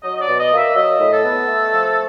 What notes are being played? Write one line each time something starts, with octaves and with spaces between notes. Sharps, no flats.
F#3 D#5
D#5
D5
B2
D#5
A#3
E5
F#3 D#5
A2
A4
B3
A3
F3